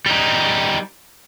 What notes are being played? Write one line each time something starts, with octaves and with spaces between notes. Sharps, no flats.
G3 D#4